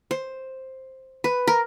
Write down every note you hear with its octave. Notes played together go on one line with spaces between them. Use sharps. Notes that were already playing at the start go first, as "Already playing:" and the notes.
C5
B4
A#4